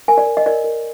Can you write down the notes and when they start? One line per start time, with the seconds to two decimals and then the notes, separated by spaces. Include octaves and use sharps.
0.08 A#4 G#5
0.18 D5
0.27 A#4
0.37 D#5
0.46 A#4 D5
0.64 A#4